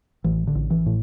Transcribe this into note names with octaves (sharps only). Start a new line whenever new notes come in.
A1 E3
D3
A1
E3
A2